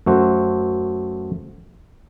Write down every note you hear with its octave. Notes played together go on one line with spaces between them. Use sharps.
F#2 A3 F#4 C5